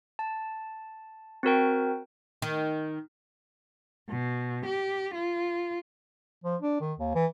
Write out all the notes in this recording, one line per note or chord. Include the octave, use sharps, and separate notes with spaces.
A5
C4 F#4 A#4 G5
D#3
B2
G4
F4
F3
D4
D#3
D#2
E3